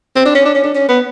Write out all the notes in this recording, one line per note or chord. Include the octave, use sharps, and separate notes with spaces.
C4
D4
C#4
D4
C#4
D4
C#4
B3